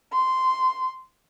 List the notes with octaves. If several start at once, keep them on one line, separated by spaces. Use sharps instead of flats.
C6